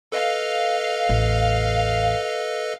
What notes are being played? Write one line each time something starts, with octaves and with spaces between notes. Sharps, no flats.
A4 B4 D#5 F5
A1 E2